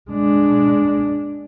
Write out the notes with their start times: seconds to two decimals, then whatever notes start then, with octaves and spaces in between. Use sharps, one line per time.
0.10 G#3 D4